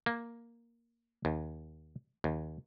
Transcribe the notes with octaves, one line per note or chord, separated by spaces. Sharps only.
A#3
D#2
D#2